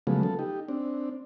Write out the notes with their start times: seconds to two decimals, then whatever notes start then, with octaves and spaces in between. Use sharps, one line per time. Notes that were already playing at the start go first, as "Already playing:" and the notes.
0.07 C#3 F3 F#3 G#3 A3 B3
0.23 A4
0.39 D#4 G4
0.68 C4 D4